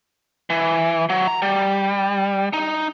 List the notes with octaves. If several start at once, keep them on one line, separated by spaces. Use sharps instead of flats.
E3
F#3
A#5
G3
D#4